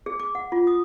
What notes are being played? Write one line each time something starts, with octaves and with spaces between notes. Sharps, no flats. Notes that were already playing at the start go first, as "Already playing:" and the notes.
G#4
D6
F#5
F4
D#6